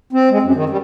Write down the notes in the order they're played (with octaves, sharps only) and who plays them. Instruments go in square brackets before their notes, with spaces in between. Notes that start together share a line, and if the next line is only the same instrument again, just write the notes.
[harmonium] C4
G#3
F#2
D#3
G3